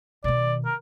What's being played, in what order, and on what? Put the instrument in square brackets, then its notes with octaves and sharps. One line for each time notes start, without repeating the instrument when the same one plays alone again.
[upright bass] B2 D#3 [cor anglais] D5
[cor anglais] A#4